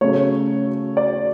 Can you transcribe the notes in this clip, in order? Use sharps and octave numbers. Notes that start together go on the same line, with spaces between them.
C#3 F#3 A3 C#5
D5